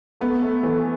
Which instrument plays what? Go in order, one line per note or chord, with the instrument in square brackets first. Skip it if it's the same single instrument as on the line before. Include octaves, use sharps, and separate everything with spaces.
[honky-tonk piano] A3 [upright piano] B3
[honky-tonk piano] A3
E3